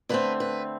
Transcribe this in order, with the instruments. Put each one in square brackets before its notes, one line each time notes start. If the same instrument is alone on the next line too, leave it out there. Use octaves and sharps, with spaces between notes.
[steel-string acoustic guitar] D3 A3 C4 B4
B4